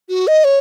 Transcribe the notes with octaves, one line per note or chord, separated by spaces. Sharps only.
F#4
D#5
C#5